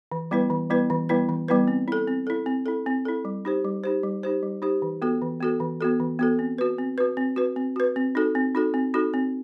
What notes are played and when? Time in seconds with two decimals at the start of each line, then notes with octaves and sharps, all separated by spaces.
0.12 E3
0.31 G3 B3 E4 B4
0.50 E3
0.70 G3 B3 E4 B4
0.90 E3
1.09 G3 B3 E4 B4
1.29 E3
1.48 G3 B3 E4 B4
1.68 C4
1.88 E4 A4
2.08 C4
2.27 E4 A4
2.46 C4
2.66 E4 A4
2.86 C4
3.05 E4 A4
3.25 G3
3.45 D#4 G4 C5
3.65 G3
3.84 D#4 G4 C5
4.03 G3
4.23 D#4 G4 C5
4.43 G3
4.62 D#4 G4 C5
4.82 E3
5.02 B3 F#4 A4
5.22 E3
5.40 B3 F#4 A4
5.60 E3
5.81 B3 F#4 A4
6.00 E3
6.19 B3 F#4 A4
6.39 C4
6.58 F#4 B4
6.78 C4
6.98 F#4 B4
7.17 C4
7.36 F#4 B4
7.56 C4
7.76 F#4 B4
7.96 C4
8.15 D#4 F#4 A4
8.35 C4
8.55 D#4 F#4 A4
8.74 C4
8.94 D#4 F#4 A4
9.14 C4